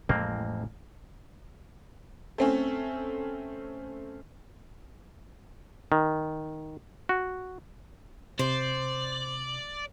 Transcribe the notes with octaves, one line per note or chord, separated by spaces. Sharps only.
A1 F2 A2 G#3 A#3 C4
A3 C4 C#4
D#3
F#4
C3 C5 D5